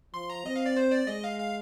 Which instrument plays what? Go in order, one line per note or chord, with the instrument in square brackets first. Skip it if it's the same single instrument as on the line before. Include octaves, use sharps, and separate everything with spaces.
[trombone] F3 [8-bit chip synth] C6
[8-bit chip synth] A#5
[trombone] C4 [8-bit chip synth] D#5
[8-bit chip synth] F5
D5
C5
D5
[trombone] G#3 [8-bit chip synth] D#5
[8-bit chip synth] F5
F5